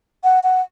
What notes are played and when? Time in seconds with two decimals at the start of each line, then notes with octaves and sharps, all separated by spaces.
0.24 F#5
0.44 F#5